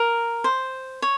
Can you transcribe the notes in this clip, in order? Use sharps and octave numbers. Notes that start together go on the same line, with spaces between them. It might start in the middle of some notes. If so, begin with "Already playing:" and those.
Already playing: A#4
C5
C#5